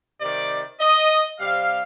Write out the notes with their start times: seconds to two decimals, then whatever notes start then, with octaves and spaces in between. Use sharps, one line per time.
0.20 C3 D#3 G3 D5
0.80 D#5
1.40 C3 G3 C4 F5